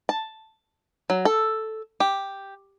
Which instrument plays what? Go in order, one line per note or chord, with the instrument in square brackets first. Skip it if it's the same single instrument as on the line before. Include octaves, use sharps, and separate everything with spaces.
[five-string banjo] A5
F#3
A4
G4